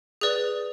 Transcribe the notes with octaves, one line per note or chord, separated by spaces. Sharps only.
G#4 B4 D5